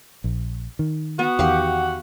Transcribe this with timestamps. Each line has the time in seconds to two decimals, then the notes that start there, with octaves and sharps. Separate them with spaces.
0.24 A#1
0.79 D#3
1.19 B3 F#4
1.39 E2 D#3 G4 F5 F#5